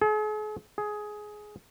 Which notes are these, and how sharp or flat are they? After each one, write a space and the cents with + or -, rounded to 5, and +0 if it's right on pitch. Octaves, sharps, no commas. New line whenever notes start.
G#4 +45
G#4 +15